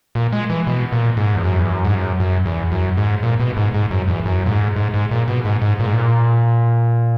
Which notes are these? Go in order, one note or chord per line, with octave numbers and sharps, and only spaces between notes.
A#2
G#3
E3
B2
A#2
G#2
E2
F#2
E2
F#2
G#2
F#2
F#2
E2
F#2
G#2
A#2
B2
G#2
G#2
F#2
E2
F#2
A#2
G#2
G#2
G#2
A#2
B2
G#2
G#2
A#2
G#2
A#2